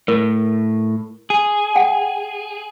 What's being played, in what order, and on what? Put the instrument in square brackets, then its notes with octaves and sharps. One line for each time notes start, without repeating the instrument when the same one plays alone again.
[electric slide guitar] A2 [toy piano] A#4
[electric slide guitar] G#4
[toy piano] F#5 G5